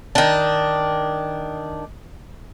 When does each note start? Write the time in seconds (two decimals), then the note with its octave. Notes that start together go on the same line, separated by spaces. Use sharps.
0.15 D#3 D4